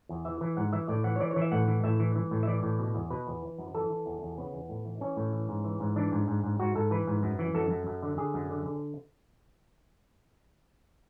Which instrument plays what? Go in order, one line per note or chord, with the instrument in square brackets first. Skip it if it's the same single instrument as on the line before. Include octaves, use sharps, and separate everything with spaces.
[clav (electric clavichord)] E2
E3 E5
E3
G#2 F#5
E3 E5
A2 D5
E3 F#5
C#5
E3 D5
C#5
E3
E5
A2 F#5
E3
A2 E5
E3
E3
A2
E5
E3 D5
A2
B2
E2
B2 B4
E2
E3
F#2
E3 A4
E3
E2
E2
C#3 B3
E2
A2
E3
E3 C#4
A2
E3
G#2
E3
G#2
E3 D4
G#2
G#2
G#2
G#2 F#4
G#2 A4
E3 B4
G#2
F#2
E3
F#2 A4
F#2
F#2
D3
D3 G#4
F#2
D3
D3